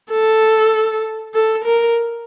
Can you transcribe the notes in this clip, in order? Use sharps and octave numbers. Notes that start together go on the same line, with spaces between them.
A4
A4
A#4